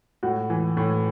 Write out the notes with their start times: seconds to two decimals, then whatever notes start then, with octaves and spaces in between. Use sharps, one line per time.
0.23 A2 F#4
0.50 E3
0.77 A2